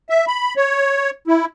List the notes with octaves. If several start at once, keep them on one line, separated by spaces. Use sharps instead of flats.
E5
B5
C#5
E4